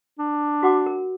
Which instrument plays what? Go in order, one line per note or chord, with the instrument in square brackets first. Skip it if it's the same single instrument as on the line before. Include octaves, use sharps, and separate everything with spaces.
[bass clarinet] D4
[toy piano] F#4 F#5 D6
A#4